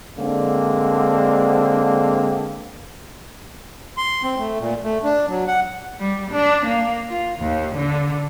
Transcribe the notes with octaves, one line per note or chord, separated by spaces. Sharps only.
D3 G#3 A#3 C4 D4
C6
C4
A3
A#2
A3
D4
F#3
F#5
G3
D4
A#3
F4
D#2
D3